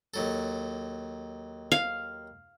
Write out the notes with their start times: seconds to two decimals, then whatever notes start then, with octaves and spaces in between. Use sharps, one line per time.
0.14 D#2 F#3 A4
1.72 F5